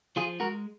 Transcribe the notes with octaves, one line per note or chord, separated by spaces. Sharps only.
F3 F4 G#4
G#3 F#4 A#4